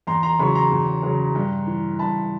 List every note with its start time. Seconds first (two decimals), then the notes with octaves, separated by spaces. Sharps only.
0.07 E2 A#5 C6
0.23 A#5 C6
0.39 C#3 F#3 B5 C#6
0.55 A#5 C6
0.71 E2
1.03 C#3 F#3
1.35 G2
1.67 E3
1.99 G2 A5 B5